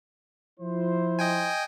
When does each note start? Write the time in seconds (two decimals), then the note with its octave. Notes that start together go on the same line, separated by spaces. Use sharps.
0.60 F3 E4 C5
1.19 D#5 G5 G#5